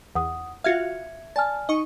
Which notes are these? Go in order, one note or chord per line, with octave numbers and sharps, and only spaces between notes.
E2 F#5 D#6
F4 F#4 E5 F5 G#6 C#7
D5 G#5 A5 F6
D#4 D#5 C#6